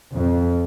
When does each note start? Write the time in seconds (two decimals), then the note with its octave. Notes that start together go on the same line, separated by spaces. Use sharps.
0.13 F2